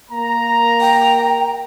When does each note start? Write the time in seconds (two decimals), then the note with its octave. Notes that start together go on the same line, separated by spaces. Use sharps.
0.11 A#3 A#5
0.81 G5